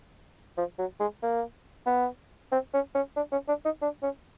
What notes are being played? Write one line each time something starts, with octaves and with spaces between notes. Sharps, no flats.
F3
F#3
G#3
A#3
B3
C4
C#4
C#4
D4
C#4
D4
D#4
D4
C#4